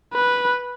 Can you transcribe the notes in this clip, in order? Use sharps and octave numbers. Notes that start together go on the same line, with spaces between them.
B4